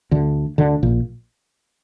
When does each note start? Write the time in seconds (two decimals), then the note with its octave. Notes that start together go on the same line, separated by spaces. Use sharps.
0.11 D2 D3
0.58 D2 D3
0.83 A#1 A#2